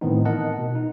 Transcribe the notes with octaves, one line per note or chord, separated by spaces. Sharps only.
A2 D#3 E3 B3 C4 D#4
A#4 D#5 F#5 A5
B2
D#4